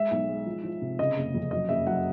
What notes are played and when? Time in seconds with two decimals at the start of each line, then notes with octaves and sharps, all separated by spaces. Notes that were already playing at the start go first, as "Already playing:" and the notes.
Already playing: G#3 E5
0.11 B1
0.29 G#3
0.46 F3
0.64 F3
0.81 C3
0.99 C#3 D#5
1.16 F#1
1.34 F2
1.51 F#3 D#5
1.69 F#1 E5
1.87 F#3 F#5